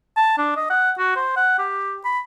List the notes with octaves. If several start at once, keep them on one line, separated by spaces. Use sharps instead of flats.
A5
D4
D#5
F#5
F#4
C5
F#5
G4
B5